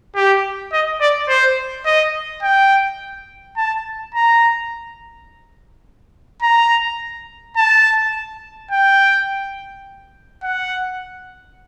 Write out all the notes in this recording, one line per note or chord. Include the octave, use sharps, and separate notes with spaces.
G4
D#5
D5
C5
D#5
G5
A5
A#5
A#5
A5
G5
F#5